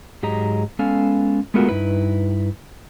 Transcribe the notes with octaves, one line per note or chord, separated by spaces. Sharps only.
G#2 F#3 G4 G#4 D#5 A#5
G#3 B3 C#4 A4 F5 G#5
G#3 A3 B3 F4 F#4 A#4
G2 D#4 E4 B4